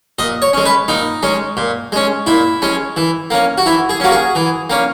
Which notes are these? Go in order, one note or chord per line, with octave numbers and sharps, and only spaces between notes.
A#2 D#5
C#5
G#3 C#4
B4
A#2 D#4
G#3 C#4
A#2
G#3 C#4
A#2 E4
G#3 C#4
E3
A#3 C#4
F#4
E3 E4
G#4
A#3 C#4 F#4
G#4
E3
A#3 C#4